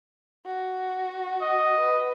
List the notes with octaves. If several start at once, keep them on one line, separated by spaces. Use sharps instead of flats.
F#4
D#5
B4